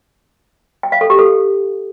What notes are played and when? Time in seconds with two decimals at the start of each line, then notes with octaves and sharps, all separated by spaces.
0.83 G5
0.92 F5
1.01 A4
1.10 G4
1.19 A4